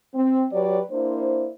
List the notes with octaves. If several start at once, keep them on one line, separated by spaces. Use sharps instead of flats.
C4
F#3 G4 B4 C#5 D5
A#3 D4 E4 C5